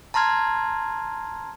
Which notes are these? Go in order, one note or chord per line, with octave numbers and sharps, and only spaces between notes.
A5 A#5 C6 F6 G#6